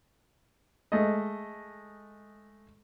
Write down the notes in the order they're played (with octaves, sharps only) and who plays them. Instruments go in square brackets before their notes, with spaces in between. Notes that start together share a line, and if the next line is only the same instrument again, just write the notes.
[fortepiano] G#3 A3 D#5